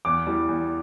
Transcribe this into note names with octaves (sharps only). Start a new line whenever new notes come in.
E2 D6
E3 G3
E2